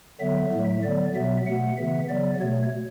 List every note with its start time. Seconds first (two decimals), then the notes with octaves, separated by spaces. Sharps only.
0.20 D3 F#3 B3 E5
0.52 A2 F#3 A3
0.83 D3 F#3 B3 D5
1.15 B2 F#3 B3 E5
1.46 B2 A3 F#5
1.77 C#3 E3 B3 E5
2.09 C#3 F#3 B3 D5
2.40 B2 A3 C#5